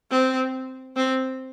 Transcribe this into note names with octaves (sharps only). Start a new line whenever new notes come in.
C4
C4